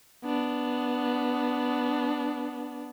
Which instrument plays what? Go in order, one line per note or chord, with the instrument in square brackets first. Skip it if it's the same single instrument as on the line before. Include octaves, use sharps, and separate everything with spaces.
[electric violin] B3 D4